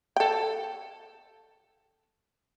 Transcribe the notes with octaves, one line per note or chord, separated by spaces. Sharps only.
A4 G5